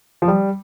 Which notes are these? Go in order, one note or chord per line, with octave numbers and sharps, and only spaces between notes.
F3
G3